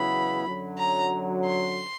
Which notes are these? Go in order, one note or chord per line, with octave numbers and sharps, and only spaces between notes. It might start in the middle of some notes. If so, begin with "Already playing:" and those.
Already playing: E2 C#3 F#3 B3 E4 B5
F#2 D3 F#3
A#5
C6